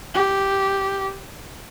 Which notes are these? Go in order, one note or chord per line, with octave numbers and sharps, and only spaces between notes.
G4